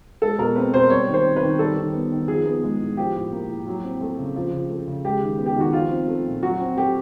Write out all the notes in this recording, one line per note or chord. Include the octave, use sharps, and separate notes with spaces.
G#3 A4
B2 A#4
C4 B4
B2 C5
G3 C#5
D#3
C5
C4
B4
D#3
G3 A4
D#3
B3
D#3
F3 G#4
B3
G#3
A2
F3 G4
A2
A#3
A2
F#3
C4
A3
C#3
F3
C#3
A3
C#3
G#3 G4
D#3
B3
G4
D#3 F#4
F3 F4
C4
A3
A#2
F#3 F#4
C4
A3 G4